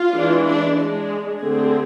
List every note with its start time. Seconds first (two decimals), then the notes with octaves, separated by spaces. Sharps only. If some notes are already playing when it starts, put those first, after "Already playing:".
Already playing: F4
0.14 E3 G#3 D4
0.46 D4
0.79 G#3 D4
1.11 G#4
1.43 D3 A3 C4